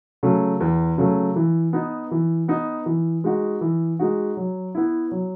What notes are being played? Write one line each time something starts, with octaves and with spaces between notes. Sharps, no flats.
C#3 F#3 A3
E2
C#3 F#3 A3
E3
B3 D#4
E3
B3 D#4
E3
G#3 D#4 F#4
E3
G#3 D#4 F#4
F#3
B3 E4
F#3